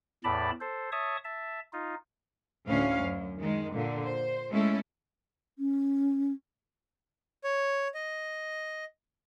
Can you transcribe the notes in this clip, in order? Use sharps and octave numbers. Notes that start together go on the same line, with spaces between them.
E2 A2 D5 A5 B5
A4 C5
C#5 E5 A5 C#6 D#6
E5 A5
D#4 F4
D2 A2 C#4 F5
F#2
D#3 G#3
A#2 D3
C5
G#3 A3 C#4 E4 A4
C#4
C#5
D#5